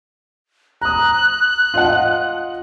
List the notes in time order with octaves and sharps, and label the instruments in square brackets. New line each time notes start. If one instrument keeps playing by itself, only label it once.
[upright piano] A#5 D#6 [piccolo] F#6
[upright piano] F4 D#5 F#5